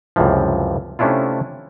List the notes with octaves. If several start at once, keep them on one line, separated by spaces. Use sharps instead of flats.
C#2 F#2 C3 E3 F3
C3 A3 C#4 D4 E4 F4